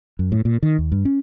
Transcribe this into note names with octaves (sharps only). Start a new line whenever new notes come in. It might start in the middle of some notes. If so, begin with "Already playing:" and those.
F#2
A2
A#2
D#3
D#2
G2
C#4